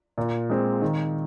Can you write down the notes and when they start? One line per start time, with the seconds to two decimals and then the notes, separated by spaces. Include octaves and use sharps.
0.18 A#2
0.50 G#3 C4
0.82 D#3